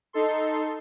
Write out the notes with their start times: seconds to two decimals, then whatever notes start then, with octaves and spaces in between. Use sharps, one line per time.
0.13 D#4 A4 C6